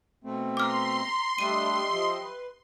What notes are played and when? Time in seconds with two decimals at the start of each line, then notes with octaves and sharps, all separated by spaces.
0.24 B2 A3 C4
0.57 A#5 C6 D6 F6 B6
1.38 G3 A3 D4 G4 D#5 E5 D#7
1.91 F3
2.21 B4